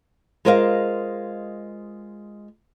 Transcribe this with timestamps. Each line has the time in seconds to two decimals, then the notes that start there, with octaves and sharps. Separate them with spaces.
0.45 G#3 F4 A#4 C5 D#5 F5